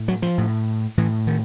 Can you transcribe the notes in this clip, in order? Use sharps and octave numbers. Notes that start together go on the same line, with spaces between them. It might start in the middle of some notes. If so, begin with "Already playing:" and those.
Already playing: A2
F#3
F3
A2
A2 E3
D#3